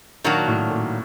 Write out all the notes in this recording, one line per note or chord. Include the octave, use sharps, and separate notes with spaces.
A#2 D#3 F#3 A#3 D4 F#4
A2
A#2